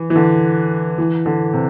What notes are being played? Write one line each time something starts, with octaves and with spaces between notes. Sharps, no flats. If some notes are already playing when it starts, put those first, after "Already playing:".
Already playing: E3
E3
D3
E3
D3
C3